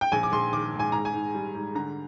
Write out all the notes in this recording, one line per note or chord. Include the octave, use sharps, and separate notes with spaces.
G5
A#1 G#5
D6
A#1 C6
D#3 D6
G#2
G#5
G#2 A#5
G#5
G#2
G3
G#2
D3 A#5